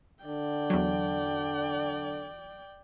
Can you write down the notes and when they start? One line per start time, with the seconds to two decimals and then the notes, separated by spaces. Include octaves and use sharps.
0.25 D3 D5 G5
0.70 E2 F#3